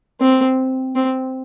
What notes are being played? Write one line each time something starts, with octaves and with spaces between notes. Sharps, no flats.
C4
C4